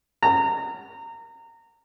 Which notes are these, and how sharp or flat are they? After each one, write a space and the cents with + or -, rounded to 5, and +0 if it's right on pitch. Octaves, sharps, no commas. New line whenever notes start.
A#5 -25